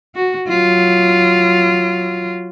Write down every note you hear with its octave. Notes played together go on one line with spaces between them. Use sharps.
F#4
F#3 F4